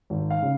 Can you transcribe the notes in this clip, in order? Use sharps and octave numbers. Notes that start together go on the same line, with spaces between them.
G#1
F5
C#3